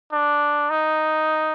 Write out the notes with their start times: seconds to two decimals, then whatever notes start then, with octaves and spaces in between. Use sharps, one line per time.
0.12 D4
0.70 D#4